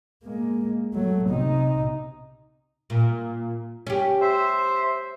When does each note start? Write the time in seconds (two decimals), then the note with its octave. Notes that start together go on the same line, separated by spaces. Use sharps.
0.24 G#3 A#3
0.94 F#3 A3
1.29 C3 D#4
2.90 A#2
3.87 C#4 G4
4.21 C5 E5